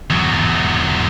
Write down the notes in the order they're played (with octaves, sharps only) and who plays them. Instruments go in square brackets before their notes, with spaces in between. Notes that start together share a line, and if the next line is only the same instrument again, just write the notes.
[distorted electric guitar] E2 F#3